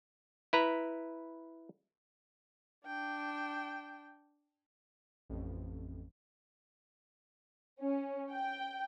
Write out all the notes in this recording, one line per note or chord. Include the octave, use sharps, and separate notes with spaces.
E4 B4 A#5
D4 G5
A1 F2
C#4
G5